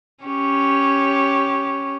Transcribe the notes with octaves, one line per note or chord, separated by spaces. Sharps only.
C#4 G4 C#5